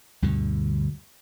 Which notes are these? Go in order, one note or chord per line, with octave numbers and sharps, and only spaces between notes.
D2 G2 B2 D3